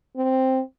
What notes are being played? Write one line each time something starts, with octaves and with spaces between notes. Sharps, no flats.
C4